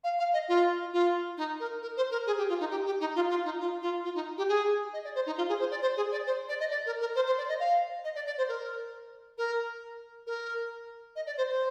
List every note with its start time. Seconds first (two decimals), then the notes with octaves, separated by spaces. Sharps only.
0.04 F5
0.19 F5
0.33 D#5
0.48 F4
0.93 F4
1.37 D#4
1.60 A#4
1.82 A#4
1.97 C5
2.11 A#4
2.27 G#4
2.38 G4
2.49 F4
2.60 D#4
2.71 G4
2.86 G4
3.00 D#4
3.16 F4
3.30 F4
3.45 D#4
3.60 F4
3.82 F4
4.04 F4
4.15 D#4
4.38 G4
4.49 G#4
4.93 D#5
5.04 D5
5.15 C5
5.26 D#4
5.37 F4
5.49 G#4
5.60 C5
5.71 D5
5.82 C5
5.97 G#4
6.12 D5
6.27 C5
6.49 D5
6.60 D#5
6.71 D5
6.86 A#4
7.00 A#4
7.15 C5
7.26 C5
7.38 D5
7.49 D#5
7.60 F5
8.04 D#5
8.15 D5
8.27 D5
8.38 C5
8.49 A#4
9.38 A#4
10.27 A#4
11.16 D#5
11.26 D5
11.38 C5
11.49 C5